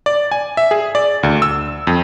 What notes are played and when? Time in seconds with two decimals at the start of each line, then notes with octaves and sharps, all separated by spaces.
0.06 D5
0.31 G#5
0.57 E5
0.71 G#4
0.95 D5
1.23 D2
1.42 E6
1.87 F2